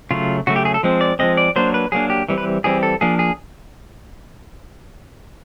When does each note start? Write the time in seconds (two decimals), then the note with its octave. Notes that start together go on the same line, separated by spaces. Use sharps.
0.11 C#3 F#3 A3 F4
0.47 C#3 F#3 A3 F#4
0.56 G4
0.65 G#4
0.74 A4
0.83 F3 G#3 C4
1.01 D5
1.19 F3 G#3 C4 D#5
1.37 D5
1.56 F#3 A#3 D4 C5
1.74 B4
1.92 F#3 A#3 D4 G#4
2.10 G4
2.29 E3 G3 C4
2.38 B4
2.64 E3 G3 C4 G#4
2.83 A4
3.01 F3 A#3 D4 G#4
3.19 G#4